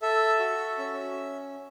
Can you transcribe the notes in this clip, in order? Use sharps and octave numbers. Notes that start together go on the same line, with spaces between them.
A4 E5
F#4
C#4